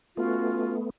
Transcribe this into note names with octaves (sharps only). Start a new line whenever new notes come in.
A3 B3 C#4 F4 F#4